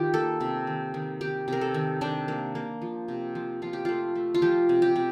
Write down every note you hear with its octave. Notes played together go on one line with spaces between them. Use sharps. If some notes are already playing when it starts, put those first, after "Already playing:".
Already playing: D#3 D#4 F4 G4
A#3 A4
C3
D#3
D#3
D#3 G4
C3 A#4
A4
D#3
C3 D4
A#3
A#3
F3
C3
F3
F3 F4
G4
A3 F4
A3
F4
F3 G4
C3
G4
C3